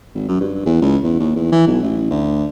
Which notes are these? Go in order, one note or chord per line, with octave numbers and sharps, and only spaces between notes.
G#1
F#2
G2
E2
C#2
E2
D#2
E2
E3
B1
A1
D2